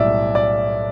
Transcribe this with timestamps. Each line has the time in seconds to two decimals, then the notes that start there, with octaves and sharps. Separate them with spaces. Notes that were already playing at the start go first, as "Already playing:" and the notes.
Already playing: B1 A2 G3 D5 E5
0.35 D5